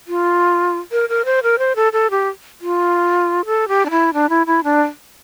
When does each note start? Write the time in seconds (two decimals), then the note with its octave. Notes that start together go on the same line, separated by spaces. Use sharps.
0.08 F4
0.92 A#4
1.09 A#4
1.25 C5
1.43 A#4
1.59 C5
1.76 A4
1.93 A4
2.11 G4
2.61 F4
3.45 A4
3.68 G4
3.86 D4
3.90 E4
4.13 D4
4.29 E4
4.46 E4
4.64 D4